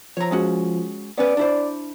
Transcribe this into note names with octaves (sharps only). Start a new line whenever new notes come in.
F3 C#5 A#5
G#3 C#4 F#4
B3 C#4 B4 D5
D4 E4 C5